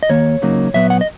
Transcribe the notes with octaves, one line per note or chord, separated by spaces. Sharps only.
D#5
D#2 D#3 A#3 C#5
C#2 C#3 F#3 A#3 D#4
A#2 F#3 B3 E5
F#5
D#5